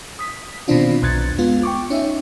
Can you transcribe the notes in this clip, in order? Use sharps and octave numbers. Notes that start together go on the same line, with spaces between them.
D#6 B6
B2 D3 D#3 C4 D4 F4
B1 E2 F#6 G#6 A6 C#7
G#3 B3 F4
G5 C#6 D6
C#4 D#4 E5